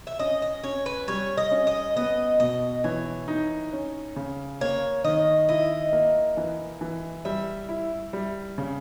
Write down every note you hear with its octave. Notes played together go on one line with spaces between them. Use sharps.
E5
C#4 D#5
D#5
C#4 C#5
B4
G3 C#5
D#5
C#4
D#5
B3 D#5
B2 D#5
E3 C#5
D#4
C#4
C#3
A#3 C#5
D#3 D#5
E4 D#5
A#3
E3
E3
G3 E5
E4
G3
C#3